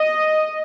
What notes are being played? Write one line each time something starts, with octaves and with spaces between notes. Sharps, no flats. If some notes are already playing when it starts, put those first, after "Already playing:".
Already playing: D#5